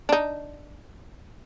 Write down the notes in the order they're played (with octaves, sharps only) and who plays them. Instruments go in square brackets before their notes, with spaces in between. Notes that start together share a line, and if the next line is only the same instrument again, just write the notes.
[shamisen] D4 D#4